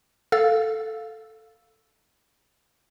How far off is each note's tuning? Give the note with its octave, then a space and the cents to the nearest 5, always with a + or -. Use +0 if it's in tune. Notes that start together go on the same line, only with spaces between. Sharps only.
A4 +0 F5 +0 E6 +0